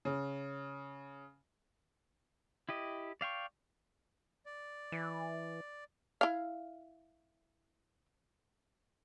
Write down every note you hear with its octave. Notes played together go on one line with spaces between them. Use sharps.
C#3
E4 G4 D#5
D5 F5 G5 C#6
D5
E3
E4 F5